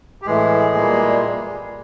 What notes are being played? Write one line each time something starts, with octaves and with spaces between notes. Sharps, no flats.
G4
A2 E3 G#3 A3 G#4
A#2 G3 A#3